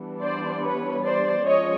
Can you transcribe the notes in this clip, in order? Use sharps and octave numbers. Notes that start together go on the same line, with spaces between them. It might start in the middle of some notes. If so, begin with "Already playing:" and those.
Already playing: E3 G3 B3 D4
C5 D5
B4 C#5
C5 D5
F3 G#3 C#4 C#5 D#5